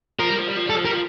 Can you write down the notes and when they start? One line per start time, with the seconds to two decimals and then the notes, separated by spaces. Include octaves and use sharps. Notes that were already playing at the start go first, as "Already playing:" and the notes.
0.19 F3 A#4
0.29 G3
0.38 F3
0.48 G3
0.56 F3
0.66 G3 A4
0.75 F3
0.84 G3 A#4
0.93 F3